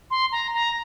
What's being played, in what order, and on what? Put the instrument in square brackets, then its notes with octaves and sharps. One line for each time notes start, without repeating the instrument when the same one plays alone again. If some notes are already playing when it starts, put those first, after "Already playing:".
[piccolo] C6
A#5
A#5